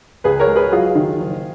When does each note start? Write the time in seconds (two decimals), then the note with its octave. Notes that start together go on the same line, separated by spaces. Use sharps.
0.24 C#2 G#4 B4
0.40 A#4 C#5
0.48 G#3
0.55 G#4 B4
0.71 F#3 F4 G#4
0.95 D#3
1.20 F#1